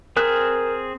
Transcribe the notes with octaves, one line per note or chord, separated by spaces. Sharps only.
C4 G#4 A#4 F#6